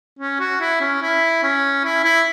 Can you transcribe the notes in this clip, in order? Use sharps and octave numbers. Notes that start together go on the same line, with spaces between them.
C#4
F#4
E4
C#4
E4
C#4
E4
E4